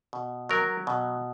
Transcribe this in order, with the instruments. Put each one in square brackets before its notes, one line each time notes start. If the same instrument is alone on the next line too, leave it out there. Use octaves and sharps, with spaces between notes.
[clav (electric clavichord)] B2
F#3 A#4
B2